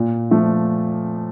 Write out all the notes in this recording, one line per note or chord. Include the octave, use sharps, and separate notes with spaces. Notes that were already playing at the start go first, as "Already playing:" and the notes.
Already playing: A#2
F3 A3